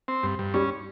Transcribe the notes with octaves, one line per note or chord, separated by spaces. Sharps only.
C4
G2
G2
G3 C#4